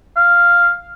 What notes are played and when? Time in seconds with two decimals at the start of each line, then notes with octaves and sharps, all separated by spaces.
0.16 F5